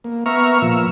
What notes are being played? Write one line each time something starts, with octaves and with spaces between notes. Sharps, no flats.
A#3
B3 E5 A#5 C#6 F6
A#2 F3 E6